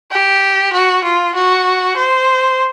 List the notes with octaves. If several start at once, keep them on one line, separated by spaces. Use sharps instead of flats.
G4
F#4
F4
F#4
C5